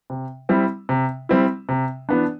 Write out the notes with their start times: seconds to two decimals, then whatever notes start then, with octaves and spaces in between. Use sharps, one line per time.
0.10 C3
0.49 G3 C4 E4
0.89 C3
1.29 G3 C4 E4
1.69 C3
2.09 E3 B3 D4